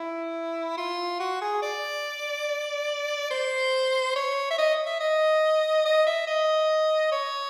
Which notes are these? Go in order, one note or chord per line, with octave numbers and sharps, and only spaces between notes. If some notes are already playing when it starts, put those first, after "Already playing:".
Already playing: E4
F4
F#4
G#4
D5
C5
C#5
E5
D#5
E5
D#5
D#5
E5
D#5
C#5